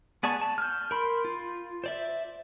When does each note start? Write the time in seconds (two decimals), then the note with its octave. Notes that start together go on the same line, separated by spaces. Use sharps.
0.23 B3 G#4 D5 A5 C#6
0.41 A5
0.58 F6 G6
0.91 A#4 B5 C6
1.25 F4
1.84 C5 D5 E5